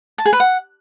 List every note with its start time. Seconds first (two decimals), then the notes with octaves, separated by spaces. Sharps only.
0.18 A5
0.25 G#4
0.33 B4
0.40 F#5